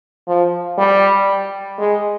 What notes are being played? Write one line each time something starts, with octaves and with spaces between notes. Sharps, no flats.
F3
G3
G#3